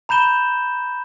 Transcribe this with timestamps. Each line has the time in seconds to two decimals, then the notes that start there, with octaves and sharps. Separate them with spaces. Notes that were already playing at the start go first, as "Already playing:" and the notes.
0.09 A#5 B5 G6 E7 G7